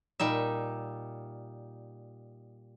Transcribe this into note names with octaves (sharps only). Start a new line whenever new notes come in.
A#2 G3 D#4 E5